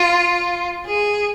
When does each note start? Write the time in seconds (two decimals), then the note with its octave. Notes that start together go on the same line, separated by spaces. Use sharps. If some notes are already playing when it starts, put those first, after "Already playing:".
Already playing: F4
0.85 G#4